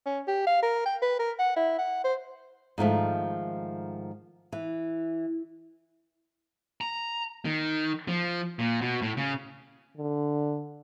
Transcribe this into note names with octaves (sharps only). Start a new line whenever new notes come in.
C#4
G4
F5
A#4
G5
B4
A#4
F#5
E4
F#5
C5
G#2 D#3 F3 A3
E3
A#5
D#3
F3
A#2
B2
A2
C#3
D3